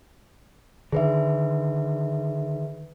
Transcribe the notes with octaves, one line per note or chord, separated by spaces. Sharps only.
D3 D#3 G#4 B4 E5